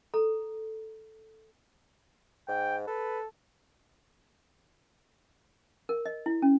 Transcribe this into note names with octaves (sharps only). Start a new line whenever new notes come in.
A4 A#5
G#2 G5
A4 B4
A#4
D#5
E4
C#4